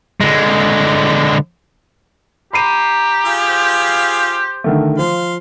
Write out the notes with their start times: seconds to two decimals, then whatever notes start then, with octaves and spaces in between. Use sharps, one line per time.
0.21 D3 G#3
2.53 G4 A#5 B5 C7 D#7
3.25 F4 G#4 F5
3.50 C5
4.64 D3 D#3 A3
4.98 F3 F5 C6